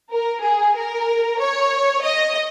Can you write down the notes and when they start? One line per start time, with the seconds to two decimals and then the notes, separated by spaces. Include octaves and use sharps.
0.12 A#4
0.43 G#4
0.76 A#4
1.40 C#5
2.03 D#5